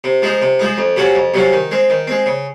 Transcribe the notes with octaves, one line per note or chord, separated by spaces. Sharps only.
C3
F3 G#3 D#4
C3
F3 G#3 D#4
F2
C3 F#3 C#4 F4
F2
C3 F#3 C#4 F4
D#3
G#3 C4
D#3
G#3 C4
C#3